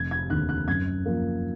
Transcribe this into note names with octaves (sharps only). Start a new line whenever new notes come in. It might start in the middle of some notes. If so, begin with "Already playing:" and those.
Already playing: F1 G#6
G#6
D#2 D3 F#6
F#6
F#2 G#6
F3 A#3